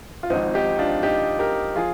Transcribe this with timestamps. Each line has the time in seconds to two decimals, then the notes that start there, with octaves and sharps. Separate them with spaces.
0.23 F4
0.30 G#1 G#2 F3 C4 D#4
0.54 D#4 G4
0.79 D4 F4
1.03 D#4 G4
1.39 G4 A#4
1.76 F3 F4 G#4